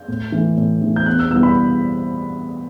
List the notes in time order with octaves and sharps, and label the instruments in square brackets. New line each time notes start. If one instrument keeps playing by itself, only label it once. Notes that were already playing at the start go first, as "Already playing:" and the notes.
Already playing: [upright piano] G6
A2
E3 A3
A2
E3 A3
G6
E2 F#6
E6
B2 G3 B3 E4 E6
B5